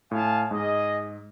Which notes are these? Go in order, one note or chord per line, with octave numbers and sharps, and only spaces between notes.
A2 F5 G#5 A5
G#2 G#4 D#5